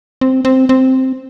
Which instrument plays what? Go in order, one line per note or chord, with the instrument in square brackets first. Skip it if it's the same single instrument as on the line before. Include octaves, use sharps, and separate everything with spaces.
[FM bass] C4
C4
C4